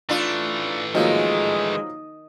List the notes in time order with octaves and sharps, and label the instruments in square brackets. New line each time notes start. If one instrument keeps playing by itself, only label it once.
[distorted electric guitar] E3 A3 [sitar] D4 F4
[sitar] D#3 [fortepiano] F3 F#3 A#3 [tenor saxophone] G#3